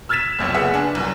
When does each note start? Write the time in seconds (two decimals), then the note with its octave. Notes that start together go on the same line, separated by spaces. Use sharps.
0.09 E6 F6 G#6 A6 B6 E7
0.39 F1 B1 F2
0.54 F#1 B3 G#4 E5 F#5
0.74 D4 G#5
0.95 C2 F#2